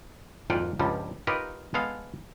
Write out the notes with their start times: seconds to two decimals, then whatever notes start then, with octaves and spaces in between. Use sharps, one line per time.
0.50 G#1 F2 A#2 F4 F#5 G5
0.79 C#2 G2 F3 G3
1.27 D#4 F4 G4 A#4 B4 C#5
1.74 G#3 B3 A4 F5